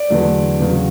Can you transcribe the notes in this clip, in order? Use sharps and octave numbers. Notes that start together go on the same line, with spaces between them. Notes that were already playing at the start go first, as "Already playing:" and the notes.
Already playing: D5
E2 D3 F#3 A3
E2 C#3 F#3